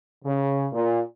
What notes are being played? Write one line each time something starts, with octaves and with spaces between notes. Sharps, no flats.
C#3
A#2